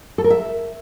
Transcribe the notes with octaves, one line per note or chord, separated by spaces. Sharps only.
A4
A#4
E5